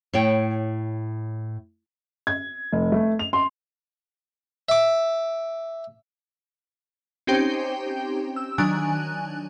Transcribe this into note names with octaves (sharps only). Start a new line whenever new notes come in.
A2 C#5 G5
G#6
F1
A3
F7
C6
E5 D6
C4 C#4 D#4 G4 C5 G5
E6
D#3 F#3 D4 G#5 F#6